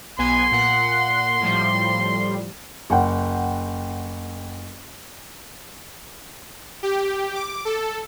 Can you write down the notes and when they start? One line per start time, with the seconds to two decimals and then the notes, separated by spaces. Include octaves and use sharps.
0.18 B1 B3 G#5 C6
0.51 A#2 F#5
1.41 A2 F3 G3
2.90 F#1 F#5 G5
6.83 G4
7.35 D6
7.65 A4